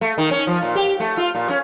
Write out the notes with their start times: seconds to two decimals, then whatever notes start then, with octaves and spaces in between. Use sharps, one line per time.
0.01 A3
0.18 D#3
0.31 C#4
0.47 F3
0.62 A#2
0.75 G4
1.00 A3
1.17 F4
1.35 A#2
1.49 C#4